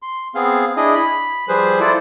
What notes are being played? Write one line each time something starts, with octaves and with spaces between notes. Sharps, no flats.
C6
B3 C4 G#4 F5
D4 E4 G#4 D#5
B5
F3 G3 G#4 B4 C5
E4 F4 A4 C5 D5